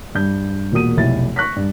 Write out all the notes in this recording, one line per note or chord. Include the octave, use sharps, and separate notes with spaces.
G2 G6
E1 A#2 A#3 F#4 D#6 D#7
F1 B1 E4 A6
C#6 F#6 A#6 B6
G2